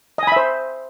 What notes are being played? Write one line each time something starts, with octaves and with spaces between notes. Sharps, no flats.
C5 D#5 E5 G#5 B5